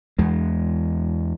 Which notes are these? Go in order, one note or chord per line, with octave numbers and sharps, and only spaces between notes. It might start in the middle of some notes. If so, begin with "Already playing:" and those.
E2 G#3